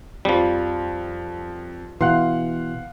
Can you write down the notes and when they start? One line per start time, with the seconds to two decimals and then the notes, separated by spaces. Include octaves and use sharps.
0.25 F2 F3 G3
2.01 B2 E3 F5 F#5 C6 F#6